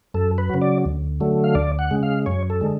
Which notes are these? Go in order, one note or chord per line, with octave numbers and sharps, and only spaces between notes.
F#2 A4
B4
C#3 F#3
D5
D2
D3 F#3 A3
F5
D2 D5
F#5
C#3 G#3
F5
F#2 C#5
A4
D3 G#3